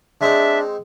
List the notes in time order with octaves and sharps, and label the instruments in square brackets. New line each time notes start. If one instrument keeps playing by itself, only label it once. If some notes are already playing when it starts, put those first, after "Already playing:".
[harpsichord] G#3 C4 D#4 [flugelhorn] D4 [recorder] E5